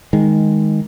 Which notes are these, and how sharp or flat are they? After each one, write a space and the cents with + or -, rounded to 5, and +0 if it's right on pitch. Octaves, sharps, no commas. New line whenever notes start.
D#3 +10 G#3 +0